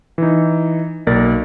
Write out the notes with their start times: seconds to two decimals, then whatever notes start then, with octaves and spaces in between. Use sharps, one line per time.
0.18 E3 D#4
1.07 B1 A#3 A#4 D5 A6